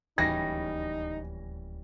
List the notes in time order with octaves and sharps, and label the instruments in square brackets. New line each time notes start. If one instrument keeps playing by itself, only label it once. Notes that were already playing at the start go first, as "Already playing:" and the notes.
[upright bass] D1 D#2 [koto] E3 G3 C#4 [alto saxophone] D#4 [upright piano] A#6